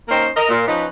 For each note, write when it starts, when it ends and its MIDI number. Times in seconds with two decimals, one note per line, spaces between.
0.09 0.27 58
0.09 0.27 61
0.09 0.27 63
0.09 0.27 70
0.09 0.27 72
0.36 0.46 70
0.36 0.46 75
0.49 0.65 46
0.68 0.85 53
0.68 0.85 61
0.68 0.85 63
0.68 0.85 71